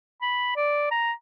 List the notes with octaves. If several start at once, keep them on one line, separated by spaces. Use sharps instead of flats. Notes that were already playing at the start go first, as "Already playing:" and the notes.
B5
D5
A#5